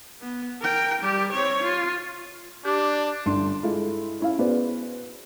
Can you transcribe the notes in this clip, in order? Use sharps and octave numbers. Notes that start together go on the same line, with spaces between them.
B3
A#4 G5
G3 G4
C4 C#5
F4
D4 G4 D6
G1 D4 C6
G#3 E4 F4 A4
C#4 E4 F5
B3 F#4 G#4 B4 C5 D5